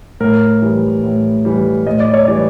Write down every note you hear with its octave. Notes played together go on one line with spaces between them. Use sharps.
A2 A#4
E3 G3
A2
E3 G3
A2 D#5
D5
C#5
E3 G3 D5